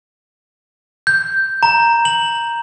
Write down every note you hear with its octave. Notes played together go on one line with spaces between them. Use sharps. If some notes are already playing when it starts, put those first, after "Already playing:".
G6
A#5
F#7